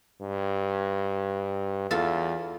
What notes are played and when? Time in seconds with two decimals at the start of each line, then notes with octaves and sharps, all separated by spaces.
0.22 G2
1.91 E2 F4 A4